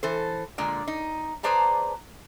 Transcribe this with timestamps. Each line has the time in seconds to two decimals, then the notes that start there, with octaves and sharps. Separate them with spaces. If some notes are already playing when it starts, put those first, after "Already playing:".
0.03 E3 A4 C5
0.58 A#2 D3 G#3 D5
0.88 D#4
1.43 G#4 B4 C5 D5 A5 A#5